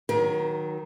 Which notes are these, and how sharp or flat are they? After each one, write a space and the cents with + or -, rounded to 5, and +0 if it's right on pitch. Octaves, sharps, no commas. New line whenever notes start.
D#3 +0 F#3 +0 A#4 +40